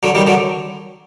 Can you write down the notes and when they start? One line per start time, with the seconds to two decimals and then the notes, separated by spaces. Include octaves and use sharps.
0.03 D3 F#3
0.15 D#3 G3
0.27 D3 F#3